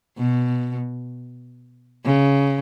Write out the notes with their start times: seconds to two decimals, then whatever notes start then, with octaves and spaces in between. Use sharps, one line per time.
0.19 B2
2.06 C#3